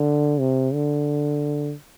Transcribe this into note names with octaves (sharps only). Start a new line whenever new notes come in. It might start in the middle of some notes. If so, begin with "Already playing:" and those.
Already playing: D3
C3
D3